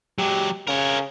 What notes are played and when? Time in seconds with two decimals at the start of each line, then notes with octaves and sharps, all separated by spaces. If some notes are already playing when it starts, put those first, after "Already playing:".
0.19 F#3 G#3 G4
0.68 C#3 A#4 C#5